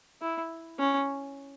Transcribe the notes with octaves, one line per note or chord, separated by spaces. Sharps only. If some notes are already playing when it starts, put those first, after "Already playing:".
E4
C#4